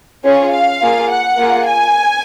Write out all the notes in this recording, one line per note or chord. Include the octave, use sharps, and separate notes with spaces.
C#4 F4 G#4 C#5
F5
A#3 F4 G#4
F#5
A#3 F4 G#4
G#5